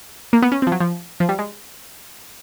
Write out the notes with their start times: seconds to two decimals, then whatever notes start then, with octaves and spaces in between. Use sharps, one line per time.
0.33 A#3
0.42 B3
0.52 C#4
0.62 C4
0.67 F3
0.72 F#3
0.80 F3
1.20 F3
1.29 G3
1.39 G#3